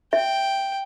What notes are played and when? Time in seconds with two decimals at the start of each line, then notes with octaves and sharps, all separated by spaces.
0.13 E5 G5